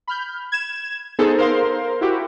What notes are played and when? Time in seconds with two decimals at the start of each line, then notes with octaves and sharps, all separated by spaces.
0.08 B5 F6 G6
0.52 G#6 E7
1.19 B3 D#4 G#4 A4 C5
1.38 A#4 C5 F5 C6
2.01 E4 F#4 G4